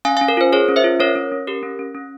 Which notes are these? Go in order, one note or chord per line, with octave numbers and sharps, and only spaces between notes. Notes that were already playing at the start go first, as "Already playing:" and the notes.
C#4 F5 G#5
F5 G#5
C#4
A#4
F4 C5
G#4 A#4 C#5
C#4
C5 E5
F4
C#4 A#4 C#5
C#4
C#4
G4 A#4
C#4
C#4
C#4